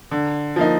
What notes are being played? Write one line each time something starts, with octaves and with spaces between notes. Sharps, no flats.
D3
F3 A#3 D#4